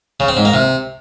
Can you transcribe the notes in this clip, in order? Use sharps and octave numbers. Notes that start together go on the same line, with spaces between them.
C#3
C4
G#2
A#3
C3